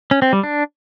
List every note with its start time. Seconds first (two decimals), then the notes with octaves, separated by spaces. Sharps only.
0.11 C#4
0.22 C4
0.33 G3
0.43 D4